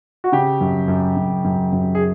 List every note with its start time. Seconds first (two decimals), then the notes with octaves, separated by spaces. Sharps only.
0.24 F#4
0.32 C#3 G4
0.61 F#2
0.88 F#2
1.17 F#2
1.44 F#2
1.72 F#2
1.95 G#4